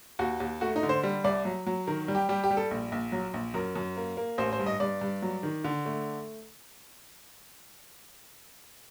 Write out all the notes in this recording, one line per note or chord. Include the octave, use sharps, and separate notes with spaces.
D#2 F#4
D#2
A3 F#4
D#4
D3
C5
G3
C2 D5
F#3
F#3
D#3 A#4
G3
G4
G3 G4
G4
G3
A4
A#1
A#1
F#3
A#1
F#2 A#4
F#2
A#3
A#3
A1 C5
C5
G2
D#5
G2 D5
G2
F#3
D#3
D3
A3